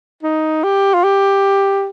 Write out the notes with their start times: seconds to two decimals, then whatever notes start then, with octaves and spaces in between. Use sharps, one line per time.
0.23 D#4
0.64 G4
0.94 F4
1.04 G4